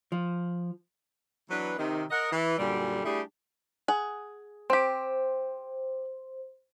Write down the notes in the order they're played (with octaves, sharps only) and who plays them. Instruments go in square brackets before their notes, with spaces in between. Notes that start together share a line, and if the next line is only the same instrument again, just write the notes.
[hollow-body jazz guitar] F3
[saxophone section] E3 F#3 B3 D4 B4
C3 D#3
A#4 D#5 F#5
E3
F#2 A#2 D3 G3
G3 A3 D4 E4 G4 G#4
[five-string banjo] G#4 F#5
[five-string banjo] C4 G4 [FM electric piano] C5